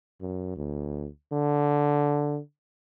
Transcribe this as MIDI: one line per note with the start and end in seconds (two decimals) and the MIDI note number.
0.21 0.53 42
0.56 1.07 38
1.32 2.39 50